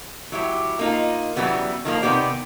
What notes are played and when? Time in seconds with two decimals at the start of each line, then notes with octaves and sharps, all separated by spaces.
0.32 F#3 E4 G4
0.79 A#3 D#4 F4
1.36 C#3 E3 F#3 G3 B3
1.85 D#3 F3 A#3
2.02 C3 D#3 B3 G4 D5